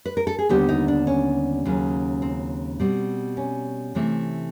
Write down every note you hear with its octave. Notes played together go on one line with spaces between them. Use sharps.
B4
A#4
A4
G#4
D#2 D3 G3 B3 G4
D#4
D4
C#4
D#2 C#3 F#3
C4
B2 G3 C4
C#4
C3 E3 A3 C4